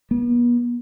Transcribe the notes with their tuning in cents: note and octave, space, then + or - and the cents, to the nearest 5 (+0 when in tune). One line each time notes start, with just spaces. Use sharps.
B3 -40